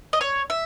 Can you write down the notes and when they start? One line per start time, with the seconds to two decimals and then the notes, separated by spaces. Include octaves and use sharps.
0.13 D#5
0.21 C#5
0.50 E5